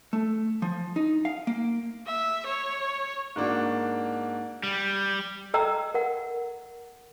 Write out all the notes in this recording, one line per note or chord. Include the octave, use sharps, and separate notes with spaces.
A3
F3
D#4
F5
A#3
E5
C#5
G#2 A#3 D4 F#4
G3
A4 D#5 G5 A#5 E6
A#4 F#5